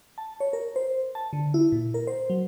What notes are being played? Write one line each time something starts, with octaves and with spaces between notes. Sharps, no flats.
A5
C#5
A#4
C5
A5
D3
E4
A#2
A#4
C5
F#3